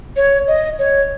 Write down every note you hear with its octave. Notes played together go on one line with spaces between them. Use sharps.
C#5
D#5
C#5